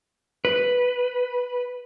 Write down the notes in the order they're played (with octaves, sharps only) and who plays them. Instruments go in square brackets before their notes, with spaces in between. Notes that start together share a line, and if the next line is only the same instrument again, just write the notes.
[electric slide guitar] B4